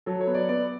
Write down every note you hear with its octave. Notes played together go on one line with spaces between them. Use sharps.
F#3 A4
C#5
B3
D5
B3 D5